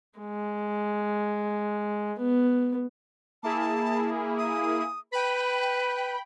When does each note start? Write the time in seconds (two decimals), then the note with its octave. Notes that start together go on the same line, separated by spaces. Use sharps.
0.20 G#3
2.18 B3
3.43 A#3 E4 G#4 A5
4.38 D#6
5.12 B4 G5 B5